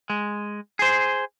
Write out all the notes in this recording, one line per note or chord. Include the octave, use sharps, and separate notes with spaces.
G#3
G#4 C5